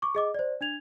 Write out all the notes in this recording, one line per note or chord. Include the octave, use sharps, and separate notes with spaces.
C#6 D6
G#4 D#5 D6
C5 D5
D4 G#6 F7